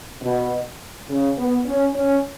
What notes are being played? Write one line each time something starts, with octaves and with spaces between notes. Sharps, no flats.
B2
C#3
B3
C#4
C#4